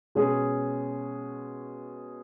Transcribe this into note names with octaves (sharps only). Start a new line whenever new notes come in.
B2 G#3 C#4 G#4